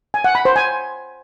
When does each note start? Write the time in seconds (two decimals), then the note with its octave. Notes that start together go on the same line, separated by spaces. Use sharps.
0.14 G#5
0.24 F#5
0.35 B5
0.45 C5
0.56 G#5